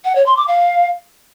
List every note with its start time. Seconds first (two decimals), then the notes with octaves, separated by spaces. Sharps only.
0.05 F#5
0.15 C#5
0.26 C6
0.37 D6
0.48 F5